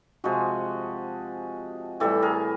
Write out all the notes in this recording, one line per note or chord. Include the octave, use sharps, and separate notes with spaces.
C3 F3 G#3 F#4 G#4
A2 E3 G3 G4 A4
G#4 A#4